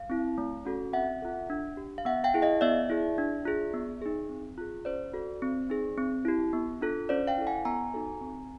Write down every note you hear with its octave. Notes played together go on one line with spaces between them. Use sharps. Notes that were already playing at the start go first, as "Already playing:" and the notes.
Already playing: F5
C4 E4
A3
C#4 F#4 A4
C4 E5 F#5
F4 A4
D4
G4
F5
B3 E5 F#5
F5 G5
E4 G#4
D#5 F5
B3 D5 E5
E4 G#4
D4
F4 G#4
B3
D#4 G#4
C4
F4 G#4
C#4 C5 D5
F#4 A4
C4
D#4 G#4
C4
E4 G4
B3
D4 F4 A4
C#4 C5 D5
F5 G5
E4 A4
F#5 G#5
B3 G#5 A#5
D#4 F#4 A4
C4